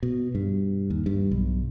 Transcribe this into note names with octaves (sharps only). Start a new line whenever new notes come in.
B2
G2
D#2
G2
B1